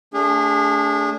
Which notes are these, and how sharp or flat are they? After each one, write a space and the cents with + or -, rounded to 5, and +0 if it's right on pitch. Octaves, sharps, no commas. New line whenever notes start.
A3 +0 D4 -30 G#4 -30